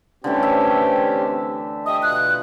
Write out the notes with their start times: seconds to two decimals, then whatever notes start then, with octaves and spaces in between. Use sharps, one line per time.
0.24 D3 E3 A3 C4 C#4 G4
0.43 E5
1.86 G4 D#5 E5 D#6
2.03 B2 F4 F#6